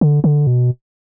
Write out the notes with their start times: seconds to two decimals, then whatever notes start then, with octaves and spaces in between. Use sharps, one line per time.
0.01 D3
0.24 D3
0.47 B2